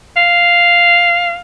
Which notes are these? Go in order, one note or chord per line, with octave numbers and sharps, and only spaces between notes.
F5